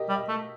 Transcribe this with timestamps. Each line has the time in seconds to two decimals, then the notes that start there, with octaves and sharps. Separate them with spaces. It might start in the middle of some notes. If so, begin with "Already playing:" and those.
Already playing: G4 A#4 D#5
0.09 G3
0.16 D#5
0.28 A3